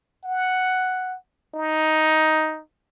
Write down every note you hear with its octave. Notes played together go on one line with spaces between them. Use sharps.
F#5
D#4